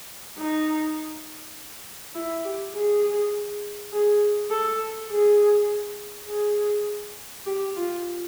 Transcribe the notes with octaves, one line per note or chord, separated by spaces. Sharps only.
D#4
E4
G4
G#4
G#4
A4
G#4
G#4
G4
F4